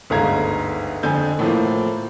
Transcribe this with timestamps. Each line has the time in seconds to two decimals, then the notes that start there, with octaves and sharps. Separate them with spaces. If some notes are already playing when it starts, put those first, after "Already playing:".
0.10 G1 D2 G#2 F5 A#5 G#6
1.03 F2 D3 G#5 G6
1.39 A2 F3 A#3